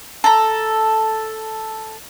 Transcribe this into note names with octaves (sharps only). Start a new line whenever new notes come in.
A4 A#5